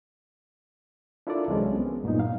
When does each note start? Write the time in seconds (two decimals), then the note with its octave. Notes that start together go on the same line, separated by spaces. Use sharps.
1.27 D4 E4 F4 A4 A#4 D5
1.48 C2 E3 F#3 G#3 C4 C#4
1.75 B3
2.04 G2 A#2 F#3 B3 D#4
2.20 F5